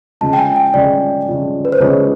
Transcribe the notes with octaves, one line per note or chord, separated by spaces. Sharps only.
C#3 F3 G#3 A5
G5
G#5
G5
C#3 F3 G#3 D5
C#3 F3 G#3
B4
C5
C#3 F3 G#3 C#5